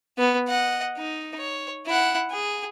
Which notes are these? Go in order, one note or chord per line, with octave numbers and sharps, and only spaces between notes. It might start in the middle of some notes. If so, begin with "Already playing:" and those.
B3
D#5 F#5
D#4
C#5
E4 F#5
G#4